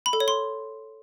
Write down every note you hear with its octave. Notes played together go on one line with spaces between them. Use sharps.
B5
A4
C#5
C6